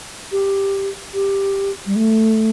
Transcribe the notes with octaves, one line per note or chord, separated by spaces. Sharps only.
G4
G4
G3
A3